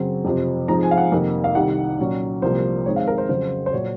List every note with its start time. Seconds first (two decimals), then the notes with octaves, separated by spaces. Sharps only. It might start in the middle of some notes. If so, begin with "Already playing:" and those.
Already playing: F#2 C#3 F#3 C4
0.25 F2 C3 F3 C4
0.68 G#2 F3 G#3 C4 A#5
0.83 G#5
0.91 F5
0.97 F#5
1.12 F2 C3 D#3 A#3
1.44 F5
1.55 C2 C3 D#3 F#5
1.99 A#2 F#3 C#4
2.42 C2 C3 F3 A#3 C5
2.86 G#2 D#3 G#3 C4 C#5
2.96 F5
3.08 A#4
3.18 C5
3.29 F2 C#3 F#3 C5
3.66 C5
3.73 A#2 F#3 C#5